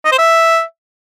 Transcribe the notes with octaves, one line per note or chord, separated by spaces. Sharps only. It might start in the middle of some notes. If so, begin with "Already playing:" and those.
D#5
C5
E5